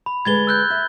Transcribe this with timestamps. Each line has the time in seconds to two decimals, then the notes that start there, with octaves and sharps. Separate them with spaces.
0.06 B5
0.25 D2 G#3 B4 G#6 A6 G7
0.47 E6 F#6 G6
0.70 E5